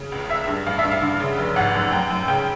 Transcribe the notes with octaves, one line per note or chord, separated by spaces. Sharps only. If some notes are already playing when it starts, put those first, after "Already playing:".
Already playing: C#3
C#2
C#2 E5
G2
A1 F5
E5
G2
F5
D3
C#3
F1
G#1 F#5
F#2
F#2 G5
F#2
C#3 G5